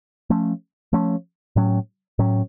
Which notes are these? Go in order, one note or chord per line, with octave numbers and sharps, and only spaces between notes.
F3 A3 C#4
F3 A3 C#4
A2 F#3 C#4
A2 F#3 C#4